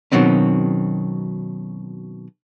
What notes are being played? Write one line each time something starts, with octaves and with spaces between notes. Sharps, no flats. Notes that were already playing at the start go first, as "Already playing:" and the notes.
B2 D#3 F#3 C4 C#4